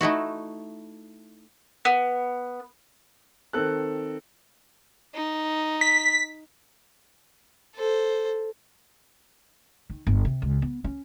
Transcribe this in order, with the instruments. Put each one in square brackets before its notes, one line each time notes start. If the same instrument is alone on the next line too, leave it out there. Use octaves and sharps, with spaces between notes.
[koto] A3 D#4 E4 F#4
[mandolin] B3
[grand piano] D#3 C4 A4 F#6
[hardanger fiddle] D#4
[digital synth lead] B6
[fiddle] A4 C5
[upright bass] D#3
G1
C3
C#2
B3
C#4